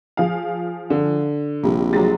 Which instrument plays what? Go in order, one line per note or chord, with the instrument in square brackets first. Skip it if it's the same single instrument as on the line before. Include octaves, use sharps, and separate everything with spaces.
[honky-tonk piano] F3 G#4 F5
[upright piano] D3
[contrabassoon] A#1 [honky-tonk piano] C3 G3
[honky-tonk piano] F#3 G4 A6 [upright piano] G#3